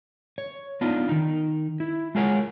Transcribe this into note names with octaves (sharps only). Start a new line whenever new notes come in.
C#5
B3 D4 D#4 F4
D#3 D#4
E4
G#3 F4 G#4 A#4 C#5 F#5